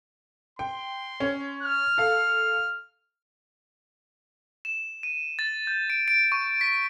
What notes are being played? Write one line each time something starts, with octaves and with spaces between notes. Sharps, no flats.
G5 C6
C#4 C#5
F6
A4 F5
E7
D#7
A6
G6
D7
D7
C#6
B6